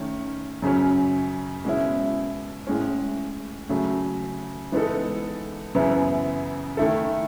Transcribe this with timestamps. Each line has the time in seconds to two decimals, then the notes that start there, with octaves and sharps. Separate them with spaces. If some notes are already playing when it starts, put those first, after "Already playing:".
Already playing: D#3 A3 C#4
0.62 F#2 C#3 F#3 C#4
1.65 B2 G#3 C#4 E4
2.67 A2 G#3 C#4
3.69 C#3 F#3 A3
4.72 E3 G#3 B3 D#4 A4
5.75 F#2 C#3 E3 B3 E4
6.77 D#3 A3 E4 A4